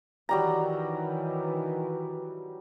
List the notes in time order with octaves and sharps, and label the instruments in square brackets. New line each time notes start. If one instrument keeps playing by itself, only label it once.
[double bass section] D#3 E3 [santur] F#3 G3 A#5